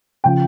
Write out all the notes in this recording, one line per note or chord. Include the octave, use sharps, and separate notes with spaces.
C#3 F3 G5